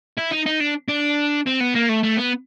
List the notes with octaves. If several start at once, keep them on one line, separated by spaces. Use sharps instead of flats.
E4
D#4
D#4
D4
D4
C4
B3
A#3
A3
A3
B3